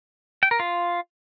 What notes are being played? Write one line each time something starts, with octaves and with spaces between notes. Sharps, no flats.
G5
A#4
F4